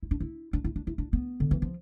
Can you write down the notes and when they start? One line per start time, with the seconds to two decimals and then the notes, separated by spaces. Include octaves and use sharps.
0.03 E4
0.11 D4
0.20 E4
0.53 D4
0.64 E4
0.76 D4
0.87 E4
0.98 D4
1.13 B3
1.40 D3
1.51 E3
1.62 F3